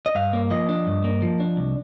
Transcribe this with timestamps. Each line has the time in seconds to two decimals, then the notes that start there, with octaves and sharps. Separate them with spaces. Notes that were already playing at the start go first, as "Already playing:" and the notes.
0.06 D#5
0.15 G2 F5
0.33 A#3
0.51 F3 D#5
0.69 D4
0.87 G2
1.04 A#3
1.22 F3
1.40 D4
1.57 C2